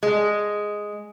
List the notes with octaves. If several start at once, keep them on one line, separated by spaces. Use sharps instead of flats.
G#3